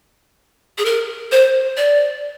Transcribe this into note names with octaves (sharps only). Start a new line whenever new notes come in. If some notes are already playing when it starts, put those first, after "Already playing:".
G#4
A#4
C5
D5